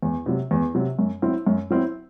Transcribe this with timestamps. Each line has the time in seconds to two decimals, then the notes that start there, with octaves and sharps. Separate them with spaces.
0.03 E2
0.26 C3 F#3
0.51 E2
0.75 C3 F#3
0.99 F#2
1.22 F#3 C4 E4
1.47 F#2
1.70 F#3 C4 E4